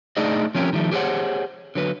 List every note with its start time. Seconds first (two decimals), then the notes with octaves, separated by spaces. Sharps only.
0.17 A3 D4 D#4 G#4 D5 D#5
0.55 F3 C4 C#4 G4 A#4
0.73 D#3 F3 G3 A3
0.92 G4 G#4 C5 C#5 F#5
1.75 D3 F#3 B4